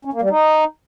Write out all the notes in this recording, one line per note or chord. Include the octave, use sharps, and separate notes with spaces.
C#4
A#3
G3
D#4